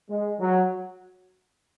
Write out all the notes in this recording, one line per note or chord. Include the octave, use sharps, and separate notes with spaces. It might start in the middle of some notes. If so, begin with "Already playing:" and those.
G#3
F#3